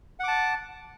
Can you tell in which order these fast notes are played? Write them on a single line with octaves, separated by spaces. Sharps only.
F#5 D6 A5